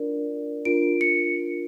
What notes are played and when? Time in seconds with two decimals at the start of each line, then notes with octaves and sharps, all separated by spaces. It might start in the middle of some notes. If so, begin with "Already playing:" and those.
Already playing: D4 F4 A#4 D5
0.65 D4 F4 A#4 D7
1.01 C#7